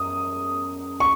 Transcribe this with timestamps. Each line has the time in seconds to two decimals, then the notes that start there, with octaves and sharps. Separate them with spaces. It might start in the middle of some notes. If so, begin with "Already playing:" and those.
Already playing: F#2 D#6
1.00 C#6